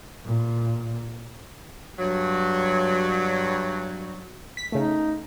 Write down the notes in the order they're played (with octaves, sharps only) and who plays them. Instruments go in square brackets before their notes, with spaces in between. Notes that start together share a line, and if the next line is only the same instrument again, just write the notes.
[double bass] A#2
[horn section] G2 F#3
[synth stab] B6
[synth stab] C#3 A3 [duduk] D#4